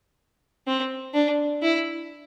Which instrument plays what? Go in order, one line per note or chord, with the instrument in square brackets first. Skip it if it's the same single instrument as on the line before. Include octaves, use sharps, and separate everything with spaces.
[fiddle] C4
D4
E4